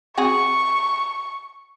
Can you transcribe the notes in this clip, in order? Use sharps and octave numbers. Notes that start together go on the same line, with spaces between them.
C4 F#4 G#4 C#6